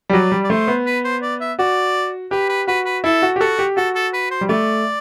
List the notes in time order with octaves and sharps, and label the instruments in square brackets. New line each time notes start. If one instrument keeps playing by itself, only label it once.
[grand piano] G3
[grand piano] F#3 [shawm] D5
[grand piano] G3
[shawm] D5
[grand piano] A3 [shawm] C5
[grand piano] B3
[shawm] B4
C5
D5
E5
[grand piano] F#4 [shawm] D5
[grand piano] G4 [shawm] B4
[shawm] B4
[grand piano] F#4 [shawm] B4
[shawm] B4
[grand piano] E4 [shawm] A4
[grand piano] F#4
G4
[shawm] F#4 [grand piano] A4
[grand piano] G4
[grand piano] F#4 [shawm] A4
[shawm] A4
B4
C5
[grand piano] G3
[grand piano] A3 [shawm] D5